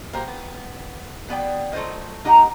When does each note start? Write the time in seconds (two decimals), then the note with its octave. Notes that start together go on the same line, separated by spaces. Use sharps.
0.13 A#3 F#4 G4 C5
0.28 B3
1.29 B2 B3 D5 G5
1.73 F#3 A3 F4 C5 D#5
2.24 A#3 D#4 G4 D#5 F#5